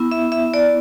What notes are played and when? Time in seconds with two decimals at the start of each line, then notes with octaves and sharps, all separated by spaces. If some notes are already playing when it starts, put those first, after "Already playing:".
Already playing: B3 E4
0.12 E5
0.32 E5
0.54 D5